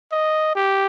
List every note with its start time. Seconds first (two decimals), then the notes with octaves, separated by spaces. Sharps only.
0.12 D#5
0.56 G4